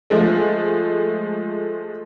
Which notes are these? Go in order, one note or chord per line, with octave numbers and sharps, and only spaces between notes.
F3 G#3 A3